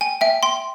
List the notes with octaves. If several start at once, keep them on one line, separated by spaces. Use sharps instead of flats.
G5 G#5
E5 G5
G5 C6